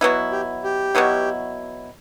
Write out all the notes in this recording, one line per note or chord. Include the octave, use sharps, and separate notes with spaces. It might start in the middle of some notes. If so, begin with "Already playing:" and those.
B2 F#3 B3 E4
G4
G4
B2 F#3 B3 E4